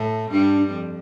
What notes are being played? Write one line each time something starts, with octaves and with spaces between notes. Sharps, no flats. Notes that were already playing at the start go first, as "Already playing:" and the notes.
Already playing: A2 A3
G2 G3 D4
F2